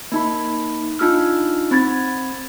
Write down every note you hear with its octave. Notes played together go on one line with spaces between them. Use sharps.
A#3 D#4 B5
D4 D#4 F4 E6 F6
C4 B5 G#6 A6